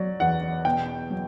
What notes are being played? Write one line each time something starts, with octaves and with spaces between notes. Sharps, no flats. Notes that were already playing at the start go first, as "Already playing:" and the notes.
Already playing: F#3 D5
E2 F#5
B2 G5
F#3